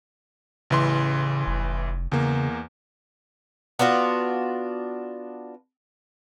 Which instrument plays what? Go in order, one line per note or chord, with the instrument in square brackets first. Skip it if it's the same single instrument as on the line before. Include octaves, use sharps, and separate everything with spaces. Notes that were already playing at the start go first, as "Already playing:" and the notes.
[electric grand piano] A1 E3 C6 [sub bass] C#3
[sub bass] F1
[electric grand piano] E2 A#3 [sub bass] C#3
[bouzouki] B3 D4 F4 F#4